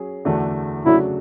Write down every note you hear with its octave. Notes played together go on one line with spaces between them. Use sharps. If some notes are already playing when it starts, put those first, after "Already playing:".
Already playing: F#3 C#4 G#4
E2 D3 A3 D4 F#4
C#3 F#3 A3 D4 E4 F#4